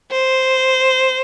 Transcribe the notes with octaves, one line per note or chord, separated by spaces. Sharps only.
C5